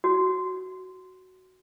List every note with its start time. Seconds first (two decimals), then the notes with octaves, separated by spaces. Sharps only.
0.04 F#4